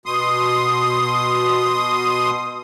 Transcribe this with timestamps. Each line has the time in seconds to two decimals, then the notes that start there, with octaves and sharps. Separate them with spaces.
0.06 B2 C6 D#6